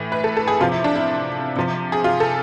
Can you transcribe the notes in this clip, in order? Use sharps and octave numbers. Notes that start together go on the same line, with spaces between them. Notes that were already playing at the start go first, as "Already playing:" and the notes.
Already playing: A2 E3
B4
A4
A4
G#4
C3 F3 F4
E4
D4
E4
C3 F3
G#4
F4
A4